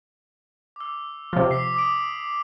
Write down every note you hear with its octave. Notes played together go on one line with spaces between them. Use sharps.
D6 E6
C3 F3
D6 B6 C7
D6 D#6 D7